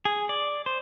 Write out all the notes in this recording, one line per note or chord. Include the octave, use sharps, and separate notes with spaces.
G#4
D5
C5